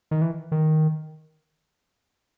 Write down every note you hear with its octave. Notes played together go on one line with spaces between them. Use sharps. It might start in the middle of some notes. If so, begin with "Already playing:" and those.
D#3
E3
D#3